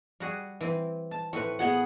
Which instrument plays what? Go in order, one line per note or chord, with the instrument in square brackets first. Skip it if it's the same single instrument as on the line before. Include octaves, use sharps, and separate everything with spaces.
[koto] G3 F#4 G#4
E3 C4
A5
[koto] A2 C4 B4 [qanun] C#6
[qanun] B3 G#4 F#5